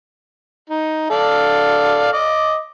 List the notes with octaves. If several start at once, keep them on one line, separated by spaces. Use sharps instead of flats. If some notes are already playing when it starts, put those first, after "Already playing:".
D#4
A4 D5 F5
D#5 D6